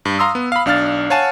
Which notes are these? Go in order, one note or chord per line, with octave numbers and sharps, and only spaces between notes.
G2
F5 A#5 C6 D#6 E6
B3
F5 B5
B1 D4 F5 F6 A6
C#5 F5 F#5 G#5 A5